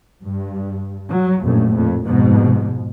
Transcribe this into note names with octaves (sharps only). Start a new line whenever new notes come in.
G2
F#3
A#1 F#2 A2
F2
F2 G#2 B2